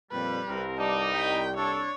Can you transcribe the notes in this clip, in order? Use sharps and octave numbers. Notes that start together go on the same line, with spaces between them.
F2 A#2 G3 B4
C2 C4 A#4
G2 G3 D#4 A5 D6
A#4 D#5 G5 B5
D4 A4 C#5